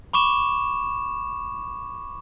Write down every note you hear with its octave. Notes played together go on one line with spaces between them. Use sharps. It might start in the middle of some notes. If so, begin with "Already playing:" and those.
B5 C#6 D6 E7